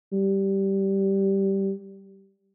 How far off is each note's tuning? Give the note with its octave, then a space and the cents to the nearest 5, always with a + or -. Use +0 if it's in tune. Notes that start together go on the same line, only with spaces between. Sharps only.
G3 -10